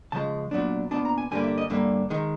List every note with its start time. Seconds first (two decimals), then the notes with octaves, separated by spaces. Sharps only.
0.12 C#3 F3 G#3 A5
0.51 A#2 F#3 B3 D4
0.91 A#2 F#3 B3 D4 A5
1.05 A#5
1.18 G#5
1.31 G2 D3 G3 A#3 G#5
1.44 E5
1.58 D#5
1.70 G2 D3 G3 A#3 E5
2.10 D#3 G#3